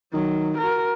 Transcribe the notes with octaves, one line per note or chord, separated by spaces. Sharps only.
D#3 F#3
F#4 A#4